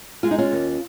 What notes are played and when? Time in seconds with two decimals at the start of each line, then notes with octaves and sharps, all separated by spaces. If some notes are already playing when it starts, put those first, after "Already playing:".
0.23 G#3 F4
0.31 D#4
0.38 C#4 F4
0.52 D#2